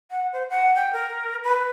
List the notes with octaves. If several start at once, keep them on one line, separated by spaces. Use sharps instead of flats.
F#5
C5
F#5
G5
A#4
B4